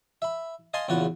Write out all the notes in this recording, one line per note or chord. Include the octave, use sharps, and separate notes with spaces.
E5 B5
D#5 F5 G#5 A5 C6
A#1 E2 C#3 F4 F#4 F#5